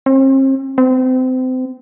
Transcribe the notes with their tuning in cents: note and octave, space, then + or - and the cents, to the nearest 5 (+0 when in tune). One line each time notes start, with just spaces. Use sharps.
C4 +40
C4 -30